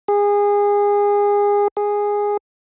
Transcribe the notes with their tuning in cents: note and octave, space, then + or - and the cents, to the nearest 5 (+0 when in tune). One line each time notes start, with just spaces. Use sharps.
G#4 -25
G#4 -10